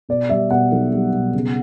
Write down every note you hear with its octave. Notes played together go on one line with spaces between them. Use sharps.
B2 D5
G3 E5
B2 F#5
B1
G3
B2
C#3